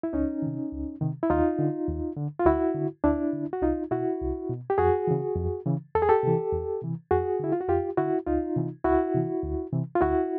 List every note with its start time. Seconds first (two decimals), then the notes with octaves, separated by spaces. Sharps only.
0.03 E4
0.13 C#2 C#4 D#4
0.42 C3 D#3
0.72 C#2
1.01 C3 D#3
1.23 E4
1.30 D#2 D#4 F4
1.59 D3
1.89 D#2
2.17 D3
2.39 F4
2.45 D2 E4 F#4
2.75 D3
3.04 D2 D4 E4
3.33 D3
3.53 F#4
3.62 C2 D#4 F4
3.91 B2 E4 F#4
4.21 C2
4.50 B2
4.70 G4
4.78 F2 F#4 G#4
5.07 C#3 E3
5.36 F2
5.66 C#3 E3
5.95 E2 A4
6.02 G#4
6.09 G4 A4
6.23 C3 E3
6.52 E2
6.82 C3 E3
7.11 F2 F#4 G#4
7.40 D3 E4
7.52 F4
7.61 F#4
7.69 F2 F4 G4
7.97 D3 E4 F#4
8.27 C#2 D#4 F4
8.56 C3 E3
8.85 C#2 E4 F#4
9.14 C3 E3
9.43 D2
9.72 C3 E3
9.95 F4
10.01 D2 E4 F#4